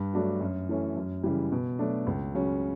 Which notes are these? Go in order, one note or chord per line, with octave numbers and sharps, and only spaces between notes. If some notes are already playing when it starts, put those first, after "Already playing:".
Already playing: G2
F#3 A3 D4 F#4
F#2
E3 A3 C#4
F#2
C#3 E3 G3
B2
F#3 A3 D4
C#2
C#3 F#3 C#4